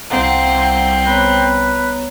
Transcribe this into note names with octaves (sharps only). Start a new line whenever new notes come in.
C2 C4 F5 F#5 A#5
B3 B4 C#5 A#5